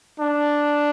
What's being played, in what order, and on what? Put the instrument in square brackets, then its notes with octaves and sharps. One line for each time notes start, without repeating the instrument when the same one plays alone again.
[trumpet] D4